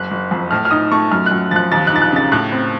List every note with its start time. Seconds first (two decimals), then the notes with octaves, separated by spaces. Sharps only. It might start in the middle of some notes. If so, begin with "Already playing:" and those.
Already playing: F#1 F#6
0.11 F#1
0.31 F2
0.51 A2 F6
0.65 F6
0.71 D#4 D#6
0.92 A3 C#6
1.11 F#2 F6
1.26 F#6
1.31 F#2
1.51 F3 F#6 A6
1.71 D#2 A6
1.87 F#6
1.92 D#4 A6
2.02 F#6
2.12 C#3 A6
2.32 A2 F#6
2.52 C4